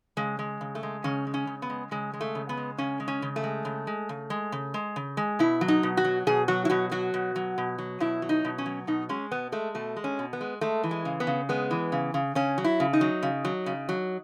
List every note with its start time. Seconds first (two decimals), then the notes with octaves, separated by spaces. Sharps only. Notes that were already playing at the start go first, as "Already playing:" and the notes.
0.17 C#3 G#3
0.39 G#3
0.61 C#3
0.75 A3
0.83 G#3
1.04 C#3 C#4
1.27 G#3
1.34 C#4
1.47 C#3
1.62 B3
1.70 G#3
1.91 C#3 G#3
2.13 G#3
2.21 A3
2.35 C#3
2.49 B3
2.57 G#3
2.78 C#3 C#4
3.00 G#3
3.08 C#4
3.22 C#3
3.36 A3
3.43 G#3
3.65 C#3
3.87 G#3
4.09 C#3
4.30 G#3
4.52 C#3
4.74 G#3
4.96 C#3
5.17 G#3
5.39 B2 E4
5.61 F#3
5.68 D#4
5.83 B2
5.97 F#4
6.05 F#3
6.27 B2 G#4
6.48 F#3 F#4
6.65 E4
6.70 B2 F#4
6.91 F#3 F#4
7.14 B2
7.36 F#3
7.58 B2
7.78 F#3
8.00 B2 E4
8.22 F#3
8.29 D#4
8.45 B2
8.58 C#4
8.66 F#3
8.87 B2 D#4
9.09 G#3 C#4
9.31 B2 B3
9.52 G#3 A3
9.75 B2 A3
9.96 G#3
10.04 C#4
10.19 B2
10.33 B3
10.41 G#3
10.61 G#3 A3
10.84 E3
10.91 G#3
11.05 C#3
11.20 B3
11.27 C#3
11.49 G#3 B3
11.71 E3
11.92 C#3
12.14 C#3
12.35 C#3 C#4
12.58 F#3
12.64 E4
12.80 C#3
12.93 D#4
13.01 F#3
13.23 C#3
13.45 F#3
13.66 C#3
13.89 F#3